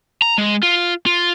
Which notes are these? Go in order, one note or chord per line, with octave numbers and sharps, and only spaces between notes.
A#5
G#3
F4
F4